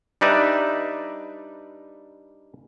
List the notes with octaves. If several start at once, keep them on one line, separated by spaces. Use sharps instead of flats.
G3 D4 D#4 B4 D5 E5